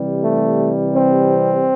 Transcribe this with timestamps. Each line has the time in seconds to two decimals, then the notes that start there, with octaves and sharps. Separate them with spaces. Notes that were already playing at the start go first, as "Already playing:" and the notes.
Already playing: C3 E3 G3
0.22 A3
0.92 C4